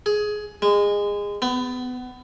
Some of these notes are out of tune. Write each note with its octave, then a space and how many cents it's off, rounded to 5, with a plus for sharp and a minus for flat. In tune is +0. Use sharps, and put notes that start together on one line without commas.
G#4 +15
G#3 -25
B3 +25